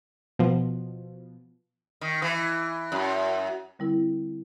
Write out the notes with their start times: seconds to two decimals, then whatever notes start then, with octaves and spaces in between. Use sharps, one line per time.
0.39 B2 F3
2.01 D#3
2.22 E3
2.92 F#2
3.79 D3 G3 C4 E4 A#4